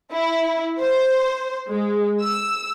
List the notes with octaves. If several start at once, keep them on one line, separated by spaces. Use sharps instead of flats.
E4
C5
G#3
E6